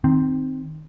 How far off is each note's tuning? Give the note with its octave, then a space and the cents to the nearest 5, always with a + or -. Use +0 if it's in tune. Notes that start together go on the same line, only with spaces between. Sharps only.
D#3 -5 C4 +0